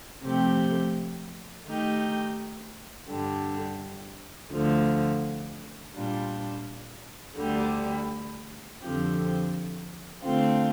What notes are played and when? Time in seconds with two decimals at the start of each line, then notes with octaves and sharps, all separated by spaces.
0.22 C3 F3 A3 C4 G4
1.65 D#3 A3 D#4 G4
3.08 G2 D3 G3 D4
4.51 D2 D3 F3
5.94 A#2 G3 D4 F4
7.38 D2 D3 G3
8.80 F2 D3 F3 C4 G4
10.23 D3 A3 C4 F4